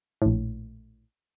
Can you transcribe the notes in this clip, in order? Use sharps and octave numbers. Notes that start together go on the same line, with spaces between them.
A#1 A2